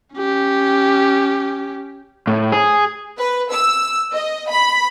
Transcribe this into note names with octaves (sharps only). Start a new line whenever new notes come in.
C#4 G4
A2
G#4
B4
E6
D#5
B5